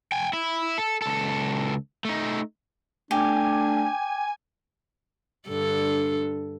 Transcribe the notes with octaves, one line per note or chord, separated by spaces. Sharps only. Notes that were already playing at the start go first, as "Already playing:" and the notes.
G5 G#5
E4
A4
C#2 A4
A3 D#4
A3 D4 G4 G#5
G2 D3 A4